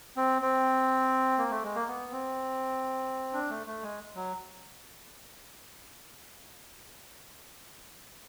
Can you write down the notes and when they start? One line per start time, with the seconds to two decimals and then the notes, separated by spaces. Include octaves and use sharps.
0.17 C4
0.42 C4
1.38 A#3
1.51 A3
1.64 G#3
1.75 A#3
1.87 B3
2.12 C4
3.33 D4
3.50 A3
3.67 A3
3.82 G#3
4.15 F#3